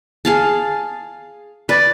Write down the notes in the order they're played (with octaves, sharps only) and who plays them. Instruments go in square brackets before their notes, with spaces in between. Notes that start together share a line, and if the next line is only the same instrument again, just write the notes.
[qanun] G#4 F5 A5
[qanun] B4 [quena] D5